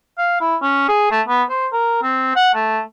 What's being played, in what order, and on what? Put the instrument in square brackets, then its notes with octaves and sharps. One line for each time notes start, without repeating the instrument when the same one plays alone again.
[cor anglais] F5
E4
C#4
G#4
A3
B3
C5
A#4
C4
F#5
A3